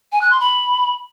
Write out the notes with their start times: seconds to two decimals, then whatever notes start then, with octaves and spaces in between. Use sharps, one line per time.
0.12 G#5
0.22 F#6
0.31 C6
0.40 B5